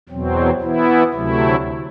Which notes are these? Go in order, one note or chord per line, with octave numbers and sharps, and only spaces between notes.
E2 B2 F#3 C4
E3 B3 E4
D2 C3 F#3 A3 E4